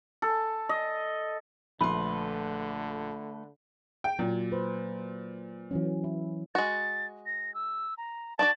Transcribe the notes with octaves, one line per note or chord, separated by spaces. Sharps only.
A4
D#5
A#1 D3 A3 B4 B5 C6
G5
A#2 F#3
B4 C5
E3 F#3 C#4
E4
G#3 F#4 A6
A#6
E6
A#5
D4 F#4 D5 A5 A6